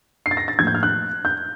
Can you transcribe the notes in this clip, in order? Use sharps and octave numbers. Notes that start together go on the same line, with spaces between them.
C7
A6
A#6
A6
A2 F3 A#3 G#6
G6
F6
F#6
G6